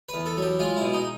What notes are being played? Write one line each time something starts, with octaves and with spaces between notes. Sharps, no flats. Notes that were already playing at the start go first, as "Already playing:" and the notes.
B4
E2
A4
F#3
G4
G#3 F4
B2 E4
D#4